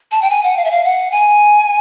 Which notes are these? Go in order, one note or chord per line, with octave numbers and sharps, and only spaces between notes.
A5
G5
G#5
F#5
F5
E5
F5
F#5
G#5